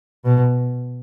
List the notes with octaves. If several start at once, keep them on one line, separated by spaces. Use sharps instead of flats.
B2